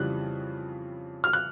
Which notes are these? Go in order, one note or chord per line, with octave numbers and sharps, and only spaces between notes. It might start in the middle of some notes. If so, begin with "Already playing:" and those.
Already playing: F2 C#3 E3 G3 F#6
F6
F#6